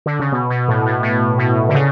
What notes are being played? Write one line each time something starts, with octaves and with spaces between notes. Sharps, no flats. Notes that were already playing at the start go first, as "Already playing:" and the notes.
D3
C#3
B2
B2
A2
A2
A2
B2
D3
C#3